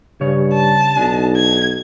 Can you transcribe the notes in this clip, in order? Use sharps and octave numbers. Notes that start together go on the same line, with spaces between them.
G2 C#3 C#5
A5
B1 D4 D#4
G#6